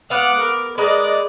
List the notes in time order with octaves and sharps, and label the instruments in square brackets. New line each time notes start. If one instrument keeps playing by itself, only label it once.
[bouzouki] B3 F5 [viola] F#5 D6
[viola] A#4
[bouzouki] G#3 A#3 B4 [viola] D5 D#5